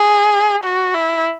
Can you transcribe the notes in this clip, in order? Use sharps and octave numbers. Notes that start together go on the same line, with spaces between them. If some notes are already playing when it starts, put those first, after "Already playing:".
Already playing: G#4
F#4
E4